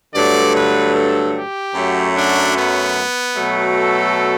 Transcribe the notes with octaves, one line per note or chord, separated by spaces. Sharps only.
G2 D3 F#3 A3 D5
B4
A4
G4
F#2 F#3 A3
D4
B3
B2 F#3 A3
A4